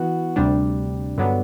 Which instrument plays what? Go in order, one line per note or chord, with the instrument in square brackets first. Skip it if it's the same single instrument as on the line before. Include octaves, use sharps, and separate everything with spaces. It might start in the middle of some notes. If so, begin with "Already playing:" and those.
Already playing: [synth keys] E3 B3 F#4
D2 C3 G3 D4
G2 D3 F#3 B3 D4